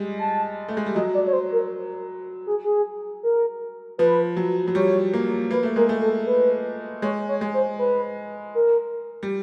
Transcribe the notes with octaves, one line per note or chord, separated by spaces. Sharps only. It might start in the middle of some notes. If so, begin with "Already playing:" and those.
Already playing: G3 G#3
A5
A3
G#3
G3
F#3 D#5
D5
C#5
C5
A#4
G#4
G#4
A#4
F3 B4
F#3
F#3
G3 C#5
A#3
A#3 B4
A3
G#3 A#4
A3
A4
B4
G#3 C#5
C#5
G#3
C5
B4
A#4
G3